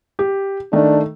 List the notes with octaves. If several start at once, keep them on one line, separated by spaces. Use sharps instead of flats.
G4
D#3 A3 D4